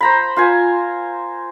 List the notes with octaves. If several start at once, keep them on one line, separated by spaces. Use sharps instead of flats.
C5 A#5 B5
F4 C5 G#5